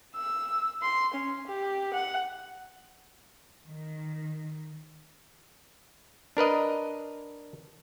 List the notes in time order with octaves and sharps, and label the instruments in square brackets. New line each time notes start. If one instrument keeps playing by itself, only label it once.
[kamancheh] E6
C6
C#4
G4
F#5
[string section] D#3
[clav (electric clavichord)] D4 A#4 B4 D#5